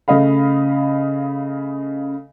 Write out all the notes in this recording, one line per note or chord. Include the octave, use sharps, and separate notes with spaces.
C#3 A3 D#5 F5 B5